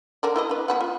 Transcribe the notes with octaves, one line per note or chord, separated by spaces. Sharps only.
D3 A#4 D5
E4 B4 D#5
D4 B4
B3 B4 F#5
F4